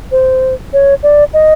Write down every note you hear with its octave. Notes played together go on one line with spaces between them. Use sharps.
C5
C#5
D5
D#5